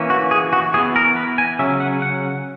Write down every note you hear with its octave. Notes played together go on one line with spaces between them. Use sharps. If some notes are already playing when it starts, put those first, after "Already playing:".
Already playing: E3 A#3 C#4
F#4
G#4
F#4
E3 B3 G#4
A#4
B4
G#5
C#3 F#3 C#4 E5
F#5
F#5